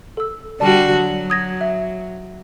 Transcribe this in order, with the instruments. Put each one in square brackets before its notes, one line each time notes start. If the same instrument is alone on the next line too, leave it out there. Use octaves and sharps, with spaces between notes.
[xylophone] A4 E6
[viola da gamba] D3 G3 F#4 [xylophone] D5 A5
[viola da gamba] F#3
[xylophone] D#6 G#6 A#6
E5